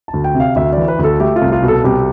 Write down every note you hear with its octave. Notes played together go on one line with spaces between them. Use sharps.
A5
D2
G5
C3
F5
D2 E5
E3 D5
B4
D2
A4
A3 G4
F4
C2
F4
B2
A4
C2 G4